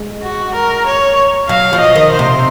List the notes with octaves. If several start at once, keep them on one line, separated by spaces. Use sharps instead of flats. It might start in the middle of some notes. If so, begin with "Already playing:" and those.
Already playing: G#3
F#4
A#4
C#5
F#3 F5
F3
D#5
D#3
C5
C3